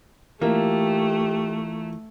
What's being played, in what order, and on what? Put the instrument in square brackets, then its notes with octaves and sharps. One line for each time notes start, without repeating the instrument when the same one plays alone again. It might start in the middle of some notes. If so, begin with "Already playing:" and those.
[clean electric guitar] E3 F4 E5 [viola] A3 [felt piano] A#3 [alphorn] G4